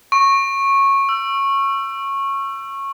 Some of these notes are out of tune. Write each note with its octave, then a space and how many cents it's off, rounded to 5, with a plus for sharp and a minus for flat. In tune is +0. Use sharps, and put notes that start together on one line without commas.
C#6 -15
E6 +30